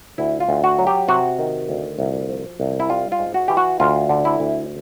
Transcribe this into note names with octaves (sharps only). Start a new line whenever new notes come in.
D2 E4
F4
D2
F#4
F#3
G4
C3 F#4
D#3
D2
C2
F3
C2
E4
G3 F4
F4
G#2
F#4
E3 G4
F#4
D2 F4
D3
E4
D2